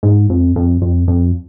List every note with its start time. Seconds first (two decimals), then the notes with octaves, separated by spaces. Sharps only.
0.03 G#2
0.30 F2
0.56 F2
0.81 F2
1.08 F2